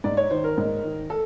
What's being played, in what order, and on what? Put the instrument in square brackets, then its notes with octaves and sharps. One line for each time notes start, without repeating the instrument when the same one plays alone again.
[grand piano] G#2 D5
C#5
D#3 C5
A#4
G#2
D#3
A4